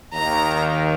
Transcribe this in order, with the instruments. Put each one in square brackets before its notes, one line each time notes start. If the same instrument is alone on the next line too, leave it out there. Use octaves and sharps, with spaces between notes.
[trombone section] D#2 D#3 [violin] A#5